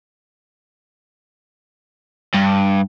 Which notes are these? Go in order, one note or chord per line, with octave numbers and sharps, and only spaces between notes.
G2